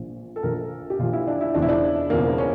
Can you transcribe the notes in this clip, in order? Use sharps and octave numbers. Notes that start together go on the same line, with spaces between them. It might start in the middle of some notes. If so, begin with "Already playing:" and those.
Already playing: A#1 A#2 F3
A4
A#1 A#2 F3 A#4
G4
A#1 A#2 F3 F4
E4
D4
E4
E1 E2 C#3 F3 D4
E4
D4
E1 E2 C#3 F3 A#3
C#4